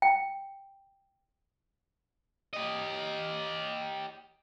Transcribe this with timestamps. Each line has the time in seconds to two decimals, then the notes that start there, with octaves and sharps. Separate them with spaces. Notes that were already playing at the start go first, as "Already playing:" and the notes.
0.02 G5
2.53 G4 D#5